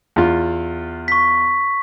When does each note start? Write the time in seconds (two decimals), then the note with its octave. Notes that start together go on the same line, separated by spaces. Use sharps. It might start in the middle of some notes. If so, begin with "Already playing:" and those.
0.16 E2 F4
1.08 C#6 B6